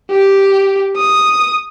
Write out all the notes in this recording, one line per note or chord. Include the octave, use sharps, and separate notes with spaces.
G4
D#6